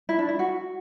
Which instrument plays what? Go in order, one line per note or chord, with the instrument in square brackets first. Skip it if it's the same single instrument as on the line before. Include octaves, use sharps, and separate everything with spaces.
[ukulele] E4
D4
E4
F#4